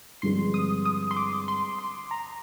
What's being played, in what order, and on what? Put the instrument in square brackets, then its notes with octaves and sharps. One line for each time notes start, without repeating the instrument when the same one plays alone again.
[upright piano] G2 D3 F3 G#3 C4 [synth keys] C6
[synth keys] D#6
D#6
C6
D6
C6
C6
A#5